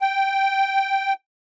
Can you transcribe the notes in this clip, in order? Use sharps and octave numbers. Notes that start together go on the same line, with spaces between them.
G5